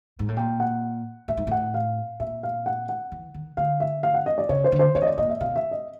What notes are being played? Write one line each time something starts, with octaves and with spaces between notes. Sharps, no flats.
G#2
A2
A#2 G5
F#5
A2 E5
G#2
A2 F#5
F5
A#2 E5
F5
F#5
F#5
E3
D#3
D3 F5
E5
F5
F#5
D#5
D5
C#3 C#5
C5
D3
C5
E3 C#5
D#5
D5
A#2 D#5
E5
B2 F5
E5
D#5